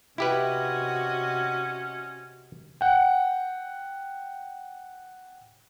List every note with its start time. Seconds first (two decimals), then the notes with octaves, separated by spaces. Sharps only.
0.18 C3 C#4 E4 F#4 G4 B4 D#5
2.81 F#5 G5